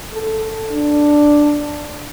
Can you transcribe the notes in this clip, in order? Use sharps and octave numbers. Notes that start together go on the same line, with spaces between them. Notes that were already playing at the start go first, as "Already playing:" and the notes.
A4
D4